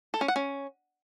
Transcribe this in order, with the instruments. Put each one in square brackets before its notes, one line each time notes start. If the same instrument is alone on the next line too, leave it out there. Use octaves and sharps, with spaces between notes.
[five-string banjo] A4
C#4
F#5
C#4